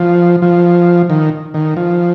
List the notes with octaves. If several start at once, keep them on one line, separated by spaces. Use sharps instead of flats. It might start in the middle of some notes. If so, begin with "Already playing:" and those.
Already playing: F3
F3
D#3
D#3
F3